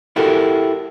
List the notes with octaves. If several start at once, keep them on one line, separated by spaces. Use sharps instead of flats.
E4 F#4 G4 A4 A#4